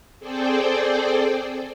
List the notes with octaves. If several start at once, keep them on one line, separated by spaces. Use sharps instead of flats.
C4 G#4 A4 C5 D5 G5